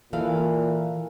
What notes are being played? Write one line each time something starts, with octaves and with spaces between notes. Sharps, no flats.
A#2 E3 A4 F5